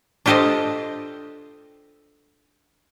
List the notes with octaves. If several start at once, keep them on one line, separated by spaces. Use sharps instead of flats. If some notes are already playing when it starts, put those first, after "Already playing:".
D4 F4 G4 A4 C5 D#5